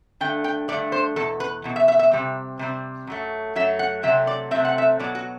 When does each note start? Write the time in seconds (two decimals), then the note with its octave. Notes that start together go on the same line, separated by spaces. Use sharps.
0.21 G2 D3 A3 G5
0.44 G5
0.68 G2 D3 A3 D5
0.92 C5
1.16 E2 B2 A4
1.40 B4
1.64 E2 B2
1.76 E5
1.88 E5
1.99 E5
2.11 C3 G3 C4
2.59 C3 G3 C4
3.07 F#2 F#3 A3
3.55 F#2 F#3 A3 E5
3.79 F#5
4.03 C3 F#3 A3 C4 E5
4.27 D5
4.51 C3 F#3 A3 C4 E5
4.65 F#5
4.78 E5
4.99 B2 F#3 B3 D5
5.15 F#4